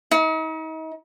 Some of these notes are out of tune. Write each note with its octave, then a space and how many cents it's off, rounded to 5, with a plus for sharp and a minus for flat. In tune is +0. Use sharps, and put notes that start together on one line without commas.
D#4 +40